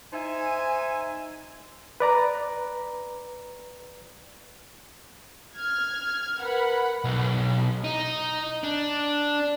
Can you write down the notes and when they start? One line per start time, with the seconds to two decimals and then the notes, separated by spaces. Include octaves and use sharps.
0.13 D#4 C5 E5 G#5
2.00 B4 D5 A#5
5.55 F6 G#6
6.40 A#4 B4 F#5 B5
7.04 B1
7.84 D#4
8.64 D4